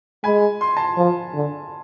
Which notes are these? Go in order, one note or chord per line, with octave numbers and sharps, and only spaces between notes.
G#3 G#5 B5
C6
A5 C6
F3
D3